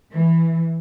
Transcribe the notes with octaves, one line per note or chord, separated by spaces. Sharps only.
E3